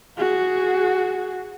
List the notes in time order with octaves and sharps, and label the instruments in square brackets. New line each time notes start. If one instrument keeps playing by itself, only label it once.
[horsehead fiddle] F#4 G#4